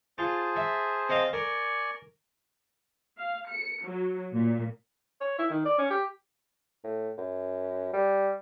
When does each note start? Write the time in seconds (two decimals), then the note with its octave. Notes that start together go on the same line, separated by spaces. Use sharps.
0.18 F4 G#4 C5 A5
0.56 E5
1.09 C4 D#5 F5
1.33 A#4 D5 G#5 C#6
3.18 F5
3.50 C#7
3.84 F#3
4.32 A#2
5.21 C#5
5.38 E4
5.50 D#3
5.65 D5
5.78 C#4
5.90 G4
6.84 A2
7.18 F#2
7.93 G3